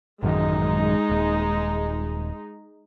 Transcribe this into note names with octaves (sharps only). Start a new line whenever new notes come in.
A1 F#2 D#3 G#3 D#4
D#1